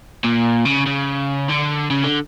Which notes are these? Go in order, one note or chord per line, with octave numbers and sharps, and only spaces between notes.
A#2
C#3
C#3
D3
C#3
D3